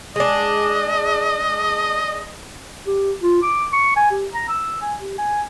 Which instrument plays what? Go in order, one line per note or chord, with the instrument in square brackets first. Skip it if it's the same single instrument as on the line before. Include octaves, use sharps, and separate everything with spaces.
[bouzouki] G#3 D4 [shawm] D#5
[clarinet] G4
F4
D6
C#6
G#5
G4
A#5
E6
G#5
G4
G#5